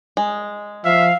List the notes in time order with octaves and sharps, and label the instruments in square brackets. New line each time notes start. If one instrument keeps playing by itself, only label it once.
[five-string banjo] G#3
[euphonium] F3 [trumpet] E5 [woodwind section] F5